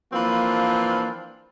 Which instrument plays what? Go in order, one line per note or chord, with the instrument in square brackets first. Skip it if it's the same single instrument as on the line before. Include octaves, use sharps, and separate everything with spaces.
[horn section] E3 F3 A#3 C4 D4 F4